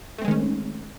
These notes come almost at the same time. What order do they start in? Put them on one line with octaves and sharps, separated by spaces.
A3 C4 G#3 D#3 C#4